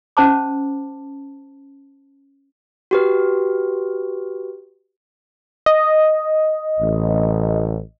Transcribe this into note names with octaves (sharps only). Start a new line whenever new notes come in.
C#4 C5 A5 D6
F#4 G4 B4
D#5
A1